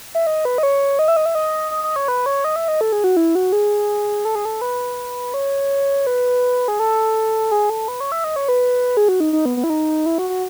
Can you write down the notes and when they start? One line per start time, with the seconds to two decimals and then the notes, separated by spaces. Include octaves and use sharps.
0.15 E5
0.27 D#5
0.45 B4
0.58 D#5
0.63 C#5
0.99 D#5
1.08 E5
1.16 D#5
1.26 E5
1.35 D#5
1.71 D#5
1.84 D#5
1.96 C#5
2.08 B4
2.26 C#5
2.44 D#5
2.56 E5
2.68 D#5
2.81 A4
2.92 G#4
3.04 F#4
3.17 E4
3.35 F#4
3.52 G#4
4.25 A4
4.35 G#4
4.45 A4
4.61 B4
5.34 C#5
6.07 B4
6.68 G#4
6.79 A4
7.52 G#4
7.70 A4
7.88 B4
8.00 C#5
8.12 E5
8.24 D#5
8.36 C#5
8.48 B4
8.97 G#4
9.09 F#4
9.20 D#4
9.33 D#4
9.45 B3
9.57 B3
9.64 E4
9.70 D#4
10.06 E4
10.18 F#4
10.30 F#4